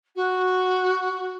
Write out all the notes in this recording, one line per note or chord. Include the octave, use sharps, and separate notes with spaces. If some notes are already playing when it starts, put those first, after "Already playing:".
F#4